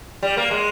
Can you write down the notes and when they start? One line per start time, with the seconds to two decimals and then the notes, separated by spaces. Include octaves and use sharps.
0.23 G3
0.37 A#3
0.51 G#3